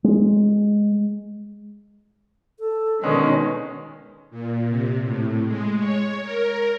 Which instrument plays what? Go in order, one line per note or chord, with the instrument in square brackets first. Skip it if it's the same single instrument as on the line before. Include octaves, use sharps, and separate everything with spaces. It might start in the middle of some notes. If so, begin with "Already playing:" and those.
[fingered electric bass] G#3
[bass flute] A4
[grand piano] B2 G#3 [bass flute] D3 [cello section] D#3 [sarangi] C#4
[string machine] A#2
C3
A2
G#3
C#5
A#4